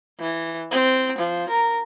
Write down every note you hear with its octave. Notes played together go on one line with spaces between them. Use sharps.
E3
C4
F3
A#4